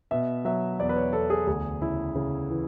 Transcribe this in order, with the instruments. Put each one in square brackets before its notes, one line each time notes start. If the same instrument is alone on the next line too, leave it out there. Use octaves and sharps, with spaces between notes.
[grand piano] B2 E5
F#3 E5
E2 D5
B4
C#5
E2 A4
G#4
D2 G#4
C#3 E4
C#3
E3